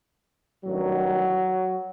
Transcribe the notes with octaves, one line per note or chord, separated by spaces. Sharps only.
A1 G2 D#3 F#3